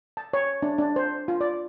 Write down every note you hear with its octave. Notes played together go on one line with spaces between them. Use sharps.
A5
C#5
D4
D4
C5
F4
D5